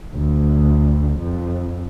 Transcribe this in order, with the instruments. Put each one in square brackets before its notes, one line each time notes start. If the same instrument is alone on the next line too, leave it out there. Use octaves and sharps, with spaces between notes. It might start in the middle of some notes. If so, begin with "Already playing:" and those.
[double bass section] D2
F2